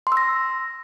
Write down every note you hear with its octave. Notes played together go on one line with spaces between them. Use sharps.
C6
E6
A#6